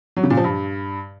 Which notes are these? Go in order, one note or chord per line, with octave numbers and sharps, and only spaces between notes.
F#3
C#3
A#2
F3
G2